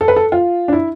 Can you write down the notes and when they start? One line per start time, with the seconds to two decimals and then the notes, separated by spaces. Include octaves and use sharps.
0.01 A4
0.08 B4
0.16 A4
0.32 F4
0.68 D4
0.73 E4